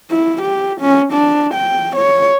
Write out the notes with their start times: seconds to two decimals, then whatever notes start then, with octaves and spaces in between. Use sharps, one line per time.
0.11 E4
0.42 G4
0.81 C#4
1.13 D4
1.54 G5
1.96 C#5